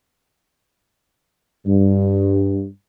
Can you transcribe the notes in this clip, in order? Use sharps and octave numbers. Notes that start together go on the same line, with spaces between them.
G2